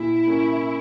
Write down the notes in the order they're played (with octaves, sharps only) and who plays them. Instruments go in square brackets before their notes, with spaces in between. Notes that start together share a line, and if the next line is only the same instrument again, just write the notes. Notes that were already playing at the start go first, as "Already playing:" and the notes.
Already playing: [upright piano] A#2 [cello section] E4
[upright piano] A#3 C#4